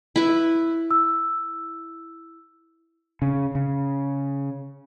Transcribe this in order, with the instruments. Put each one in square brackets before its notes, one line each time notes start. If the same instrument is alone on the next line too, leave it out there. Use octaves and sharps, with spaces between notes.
[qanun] E4 B4
[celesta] E6
[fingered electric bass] C#3
C#3